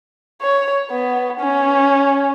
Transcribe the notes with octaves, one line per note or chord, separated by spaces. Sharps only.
C#5
B3
C#4